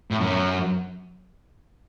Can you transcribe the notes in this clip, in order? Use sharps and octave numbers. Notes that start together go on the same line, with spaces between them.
A2
F#2